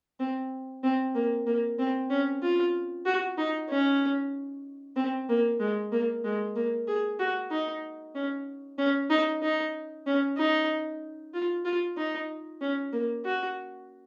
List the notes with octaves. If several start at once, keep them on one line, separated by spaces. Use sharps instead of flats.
C4
C4
A#3
A#3
C4
C#4
F4
F#4
D#4
C#4
C4
A#3
G#3
A#3
G#3
A#3
G#4
F#4
D#4
C#4
C#4
D#4
D#4
C#4
D#4
F4
F4
D#4
C#4
A#3
F#4